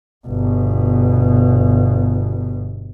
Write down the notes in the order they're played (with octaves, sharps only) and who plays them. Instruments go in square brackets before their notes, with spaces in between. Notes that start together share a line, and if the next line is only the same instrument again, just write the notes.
[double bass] G1 B2